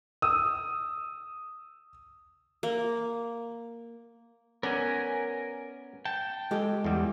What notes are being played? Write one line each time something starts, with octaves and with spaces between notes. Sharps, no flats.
D#6 E6
A#3
B3 C#4 A#4 D5 G#5
G5 A5
G#3 G4 A4
E2 G3